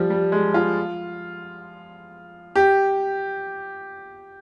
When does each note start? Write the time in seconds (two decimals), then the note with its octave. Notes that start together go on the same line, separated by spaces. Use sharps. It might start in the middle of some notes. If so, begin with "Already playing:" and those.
Already playing: F3 G3
0.10 G3
0.32 G#3
0.54 F4
2.56 G4